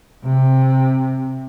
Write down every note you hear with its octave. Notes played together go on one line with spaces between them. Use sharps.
C3